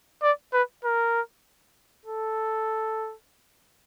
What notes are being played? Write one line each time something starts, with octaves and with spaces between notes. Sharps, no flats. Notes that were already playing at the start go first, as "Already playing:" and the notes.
D5
B4
A#4
A4